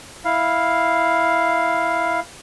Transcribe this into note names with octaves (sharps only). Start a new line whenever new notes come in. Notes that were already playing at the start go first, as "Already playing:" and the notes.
E4 F5